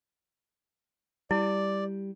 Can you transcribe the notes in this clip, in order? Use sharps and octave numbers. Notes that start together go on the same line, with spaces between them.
G3 E4 D5